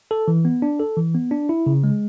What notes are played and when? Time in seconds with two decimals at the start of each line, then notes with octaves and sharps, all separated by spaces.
0.11 A4
0.28 E3
0.45 B3
0.62 D4
0.80 A4
0.97 E3
1.15 B3
1.31 D4
1.49 E4
1.66 C#3
1.84 G#3